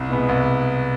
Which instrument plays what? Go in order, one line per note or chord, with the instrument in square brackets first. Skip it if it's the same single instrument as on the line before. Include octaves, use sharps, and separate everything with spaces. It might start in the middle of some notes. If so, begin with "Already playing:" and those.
Already playing: [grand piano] C2
B2 G#3 B3
C2